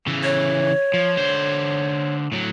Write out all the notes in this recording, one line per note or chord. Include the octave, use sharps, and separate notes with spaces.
C#3 E3
C#5
F3
D3 C5
A2 F#3